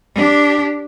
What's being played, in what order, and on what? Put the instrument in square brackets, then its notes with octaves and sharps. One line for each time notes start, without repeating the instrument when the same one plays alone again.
[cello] D4 G4